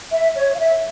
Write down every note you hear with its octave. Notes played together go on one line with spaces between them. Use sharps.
E5
C#5
F5
E5